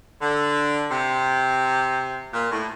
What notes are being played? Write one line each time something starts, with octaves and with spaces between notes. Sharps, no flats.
D3
C3
A#2
A2